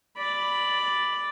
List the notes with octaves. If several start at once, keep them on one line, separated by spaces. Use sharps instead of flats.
D5 B5